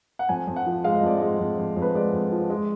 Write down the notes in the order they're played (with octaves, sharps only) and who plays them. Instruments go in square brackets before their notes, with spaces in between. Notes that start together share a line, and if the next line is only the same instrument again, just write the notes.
[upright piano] F#5
F2 G#5
F2
F#5
F3
G#3 F5
D#5
F2 D5
G#3 D#5
F2
F2
F2
B4
G#3 D5
F2
F3
G#3